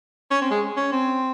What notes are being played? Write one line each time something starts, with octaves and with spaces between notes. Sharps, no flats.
C#4
C4
G#3
C#4
C4